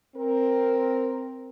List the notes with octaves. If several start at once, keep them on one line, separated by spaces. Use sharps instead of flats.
C4 A#4